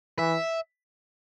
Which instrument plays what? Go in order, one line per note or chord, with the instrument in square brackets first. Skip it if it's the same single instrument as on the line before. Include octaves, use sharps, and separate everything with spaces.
[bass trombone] E3 [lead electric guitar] E5